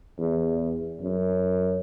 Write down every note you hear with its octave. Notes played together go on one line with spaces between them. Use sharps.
E2
F#2